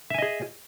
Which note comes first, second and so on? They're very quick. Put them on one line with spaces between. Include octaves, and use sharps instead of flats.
E5 G#5 D#5 G#4